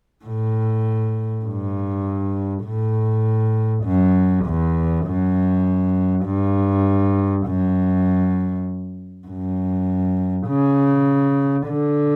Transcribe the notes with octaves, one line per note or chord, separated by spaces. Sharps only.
A2
G2
A2
F#2
E2
F#2
G2
F#2
F#2
C#3
D3